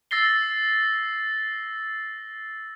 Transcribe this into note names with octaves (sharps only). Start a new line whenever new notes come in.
E6 A6 A#6 C7 G7